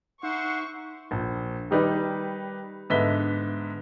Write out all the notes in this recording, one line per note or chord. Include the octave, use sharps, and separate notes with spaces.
D#4 C5 E5 F#5 C6 C#6
A#1
D#3 G3 D#4 B4 D5
G#2 D3 B3 E5 B6 G7